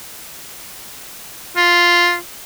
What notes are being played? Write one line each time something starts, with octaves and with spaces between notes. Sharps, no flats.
F4